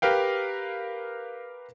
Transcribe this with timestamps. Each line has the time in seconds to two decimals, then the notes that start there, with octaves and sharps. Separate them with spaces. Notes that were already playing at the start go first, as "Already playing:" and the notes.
0.02 G4 A#4 B4 F5 G5